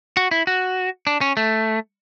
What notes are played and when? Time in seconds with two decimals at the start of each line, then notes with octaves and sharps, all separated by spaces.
0.17 F#4
0.31 E4
0.47 F#4
1.07 D4
1.21 C#4
1.37 A3